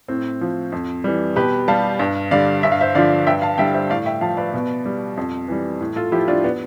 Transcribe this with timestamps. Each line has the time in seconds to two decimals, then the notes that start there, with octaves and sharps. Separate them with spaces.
0.08 A2 C4
0.41 F3
0.72 F2
1.04 E3 G3
1.36 B2 G4 B4
1.68 G3 F5 A5
1.99 G2
2.31 D3 G3 D5 F5
2.63 G2 E5
2.72 F5
2.81 C5 E5
2.95 D3 F3 D5 F5
3.27 G2 E5 G5
3.42 F5 A5
3.58 D3 G3 E5 G5
3.74 C5 E5
3.90 A2 D5 F5
4.06 E5 G5
4.21 F3 F5 A5
4.37 B4 D5
4.54 B2
4.86 G3
5.17 F2
5.48 E3 G3
5.81 A2
5.96 F4 A4
6.12 F3 E4 G4
6.28 D4 F4
6.44 B3 D4